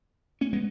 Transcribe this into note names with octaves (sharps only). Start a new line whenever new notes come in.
A3 C#4
G#3 B3